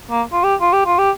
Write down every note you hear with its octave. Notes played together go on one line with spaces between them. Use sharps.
A#3
F4
G4
F4
G4
F4
G4